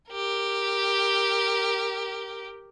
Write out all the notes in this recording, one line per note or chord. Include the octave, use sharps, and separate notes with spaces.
G4 A#4